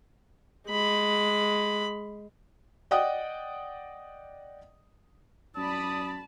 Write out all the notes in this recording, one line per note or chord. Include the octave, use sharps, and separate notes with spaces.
G#3 B5
D5 D#5 F#5 G5 D#6
F#2 D5 A5 B5 D#6